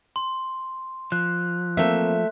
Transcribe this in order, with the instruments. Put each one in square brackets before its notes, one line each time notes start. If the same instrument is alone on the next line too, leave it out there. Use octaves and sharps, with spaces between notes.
[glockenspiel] C6
[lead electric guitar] F3 [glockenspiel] F#6
[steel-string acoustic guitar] A3 E5 [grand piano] A#3 C4